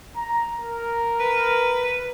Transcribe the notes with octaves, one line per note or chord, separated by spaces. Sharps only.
A#5
A#4
B4